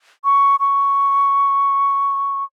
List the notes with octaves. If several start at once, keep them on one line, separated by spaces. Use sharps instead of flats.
C#6
C#6